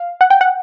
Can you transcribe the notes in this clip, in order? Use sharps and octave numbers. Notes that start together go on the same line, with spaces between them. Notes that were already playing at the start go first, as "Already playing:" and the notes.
Already playing: F5
F#5
G5
F#5